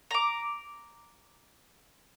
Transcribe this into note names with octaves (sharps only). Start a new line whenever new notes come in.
A#5 D6